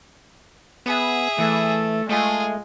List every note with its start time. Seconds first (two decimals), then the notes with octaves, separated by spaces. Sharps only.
0.86 B3 G#4 E5
1.38 E3 A3
2.09 G#3 A3 F4 G#4